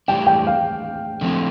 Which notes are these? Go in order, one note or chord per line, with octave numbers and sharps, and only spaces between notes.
A2 E3 G3 D4 G5
G5
F5
D3 F3 A3 C4 E4